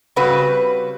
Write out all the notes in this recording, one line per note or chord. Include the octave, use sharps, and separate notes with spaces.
C#3 G3 C4 F#4 B4